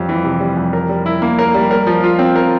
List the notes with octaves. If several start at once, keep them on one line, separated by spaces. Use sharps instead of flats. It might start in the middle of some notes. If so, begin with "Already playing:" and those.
Already playing: F2 G3
E3
C3
G3
F2
A#4
G3
E4
A#3
A#4
G3
A#4
F3
F4
C4
A#4